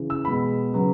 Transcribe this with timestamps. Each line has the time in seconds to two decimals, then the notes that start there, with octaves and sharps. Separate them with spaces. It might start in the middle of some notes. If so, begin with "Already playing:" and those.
Already playing: C#3 E3
0.10 E6
0.25 B2 G#3 B3 B5
0.72 C#3 F#3 B3